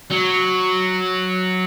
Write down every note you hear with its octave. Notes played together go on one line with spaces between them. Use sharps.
F#3